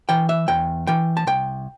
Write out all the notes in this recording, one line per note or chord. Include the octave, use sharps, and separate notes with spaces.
E3 G5
E5
E2 G5
E3 G5
A5
C2 G5